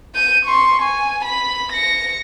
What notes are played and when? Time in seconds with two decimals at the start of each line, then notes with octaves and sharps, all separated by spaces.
0.15 G6 D#7
0.45 C6 C#6
0.82 G#5
1.24 B5
1.72 A#6 C#7